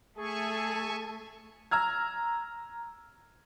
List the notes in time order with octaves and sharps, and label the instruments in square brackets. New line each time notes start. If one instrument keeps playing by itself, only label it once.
[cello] A3 [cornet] G#4 [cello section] A4 [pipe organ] E5 G#5 C#6
[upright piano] A#5 E6 F6 G#6